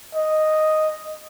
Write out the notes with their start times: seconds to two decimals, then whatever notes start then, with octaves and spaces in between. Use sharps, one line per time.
0.15 D#5